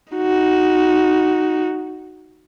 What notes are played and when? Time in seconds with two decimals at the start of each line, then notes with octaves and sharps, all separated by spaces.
0.14 D#4 F#4